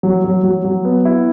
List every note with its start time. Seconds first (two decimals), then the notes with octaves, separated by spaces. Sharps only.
0.03 F#3
0.24 F#3
0.44 F#3
0.64 F#3
0.85 B3
1.05 E4